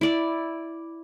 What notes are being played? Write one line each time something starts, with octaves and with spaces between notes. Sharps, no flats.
E4 D5